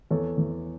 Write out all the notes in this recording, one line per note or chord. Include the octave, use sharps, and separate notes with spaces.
E2 A4 C#5
E2